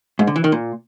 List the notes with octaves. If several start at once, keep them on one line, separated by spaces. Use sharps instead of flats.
G#2
D3
E3
D#3
A#2